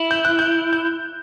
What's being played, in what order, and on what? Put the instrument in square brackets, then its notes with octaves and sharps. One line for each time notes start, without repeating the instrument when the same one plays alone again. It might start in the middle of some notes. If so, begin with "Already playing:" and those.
Already playing: [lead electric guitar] E4
[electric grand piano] G6
F#6
G6
G6